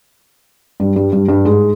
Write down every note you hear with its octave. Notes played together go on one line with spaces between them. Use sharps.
G2 G3
G2 G3
G2 G3
G2 G3
G#2 G#3